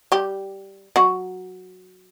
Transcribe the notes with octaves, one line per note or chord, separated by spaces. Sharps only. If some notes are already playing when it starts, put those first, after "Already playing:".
G3 G4
F#3 F#4